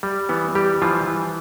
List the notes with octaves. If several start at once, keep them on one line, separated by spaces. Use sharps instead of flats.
G3
E3 B3
G3 G4
E3 F3 F4
E3